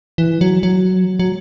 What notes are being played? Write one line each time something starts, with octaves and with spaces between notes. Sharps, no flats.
E3
F#3
F#3
F#3